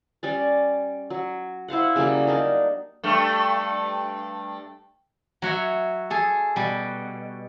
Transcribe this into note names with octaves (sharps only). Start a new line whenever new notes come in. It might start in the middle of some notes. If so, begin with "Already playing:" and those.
G3 C#4 D5
F#3
E4 C5 F5 F#5
C#3 F#3 G3 A#3
D4 D#4 A#4
G2 A3
F#3 F#4 C#5 E5
G#4 A4
B2 G3